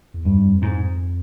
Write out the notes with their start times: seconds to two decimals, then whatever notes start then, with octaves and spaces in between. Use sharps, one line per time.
0.14 E2
0.25 G2
0.38 F2
0.62 G#2